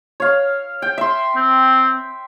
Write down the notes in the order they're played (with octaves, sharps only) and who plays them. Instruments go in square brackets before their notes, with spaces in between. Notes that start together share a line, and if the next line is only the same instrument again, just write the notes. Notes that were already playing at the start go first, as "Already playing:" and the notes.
[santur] C#5 F5
G5
E5 C6
[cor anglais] C4